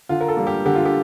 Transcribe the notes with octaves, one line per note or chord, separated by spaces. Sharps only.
D3 F4
A#4
A4
G3 A#3
G4
D3 G4
F4
G4